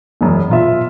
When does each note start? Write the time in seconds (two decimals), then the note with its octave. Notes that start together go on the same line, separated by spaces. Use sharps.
0.21 E1 F#2
0.49 B2 F4 E5